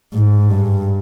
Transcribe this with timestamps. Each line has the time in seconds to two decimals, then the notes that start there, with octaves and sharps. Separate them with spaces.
0.13 G#2
0.49 G2